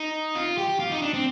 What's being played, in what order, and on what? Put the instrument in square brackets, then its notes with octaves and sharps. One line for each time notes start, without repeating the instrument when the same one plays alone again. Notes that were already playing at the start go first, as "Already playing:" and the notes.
Already playing: [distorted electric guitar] D#4
F4
G4
F4
D#4
D4
C4